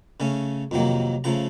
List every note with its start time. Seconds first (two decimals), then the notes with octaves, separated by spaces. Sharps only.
0.20 C#3 A3 C#4
0.71 F2 C3 D#3 F#3 A#3
1.24 C#3 F3 A3 A#5